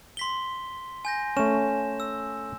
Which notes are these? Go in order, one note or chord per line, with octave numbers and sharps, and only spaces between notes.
C6 B6 G7
G#5 G6 A#6
A3 C#4 E7
E6